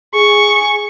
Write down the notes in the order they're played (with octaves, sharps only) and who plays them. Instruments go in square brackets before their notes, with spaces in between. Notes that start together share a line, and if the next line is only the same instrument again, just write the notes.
[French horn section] G#4 [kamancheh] C#6